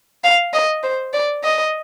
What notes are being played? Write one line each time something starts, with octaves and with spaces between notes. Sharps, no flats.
F5
D#5
C5
D5
D#5